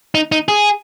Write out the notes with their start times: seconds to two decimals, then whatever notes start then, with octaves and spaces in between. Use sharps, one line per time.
0.15 D#4
0.32 D#4
0.49 G#4